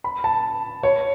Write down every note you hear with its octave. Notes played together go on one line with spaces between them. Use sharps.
B5
A5
C#5